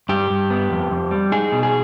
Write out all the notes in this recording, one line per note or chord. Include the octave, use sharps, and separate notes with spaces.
G2 G4
G2
B3
F2
F2
G3
D#4 G#4
B2
G#4